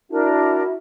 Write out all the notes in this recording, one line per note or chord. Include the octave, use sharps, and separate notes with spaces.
D4 E4 F#4 A#4